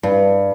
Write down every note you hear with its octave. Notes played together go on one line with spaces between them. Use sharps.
G2